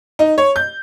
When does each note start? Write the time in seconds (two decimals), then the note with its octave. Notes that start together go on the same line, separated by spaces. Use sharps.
0.19 D#4
0.38 C#5
0.56 G6